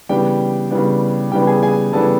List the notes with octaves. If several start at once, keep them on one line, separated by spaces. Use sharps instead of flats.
C#3 E3 G3 B3 D4 G4 G5
C#3 E3 G3 B3 D4
C#3 E3 G3 B3 D4 G4 G5
G#4 G#5
G#4 G#5
C#3 E3 G3 B3 D4 A4 A5